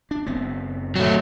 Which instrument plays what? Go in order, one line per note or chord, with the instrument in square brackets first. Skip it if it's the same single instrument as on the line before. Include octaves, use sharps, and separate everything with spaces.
[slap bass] D4
F#1 B3 C4
[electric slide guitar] F#3 A3